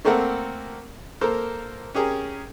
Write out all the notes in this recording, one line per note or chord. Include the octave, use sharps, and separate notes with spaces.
A3 A#3 C4 A4 A#4 F#5
A#3 A4 A#4 C5
C#4 G4 G#4 A#4